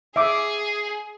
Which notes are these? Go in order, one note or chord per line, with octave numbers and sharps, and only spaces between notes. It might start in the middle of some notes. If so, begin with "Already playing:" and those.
G#4 E5 D6